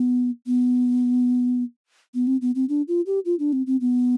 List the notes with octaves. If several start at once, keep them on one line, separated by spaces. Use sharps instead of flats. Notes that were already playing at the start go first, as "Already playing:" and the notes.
Already playing: B3
B3
B3
C4
B3
C4
D4
F4
G4
F4
D4
C4
C4
B3